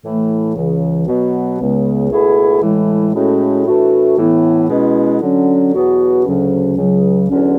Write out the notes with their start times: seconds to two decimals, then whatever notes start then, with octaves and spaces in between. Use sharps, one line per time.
0.04 A2 E3 A3
0.55 C#2 C#3 E3
1.07 B2 F#3 B3 F#4
1.60 C#2 C#3 G#3 B3
2.11 C#2 B2 A3 E4 G#4
2.63 A2 E3 G#3
3.14 A2 G#3 C#4 F#4
3.66 A2 E3 A3 D4 F#4
4.18 A2 E3 B3 E4
4.70 B2 G#3 C#4 E4
5.22 D3 F#3 C#4
5.73 E2 B2 F#3 B3 F#4
6.25 D2 C#3 F#3 C#4
6.77 C#2 C#3 F#3
7.29 E2 D3 F#3 C#4